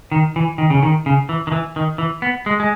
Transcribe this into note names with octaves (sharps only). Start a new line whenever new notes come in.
D#3
E3
D#3
C#3
D#3
C#3
E3
D#3
E3
D#3
E3
B3
G#3
G#3